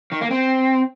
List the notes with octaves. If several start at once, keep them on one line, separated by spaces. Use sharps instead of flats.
D#3
A#3
C4